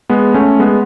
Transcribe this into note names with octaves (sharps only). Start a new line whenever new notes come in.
G#3 B3
A3 C#4
G#3 B3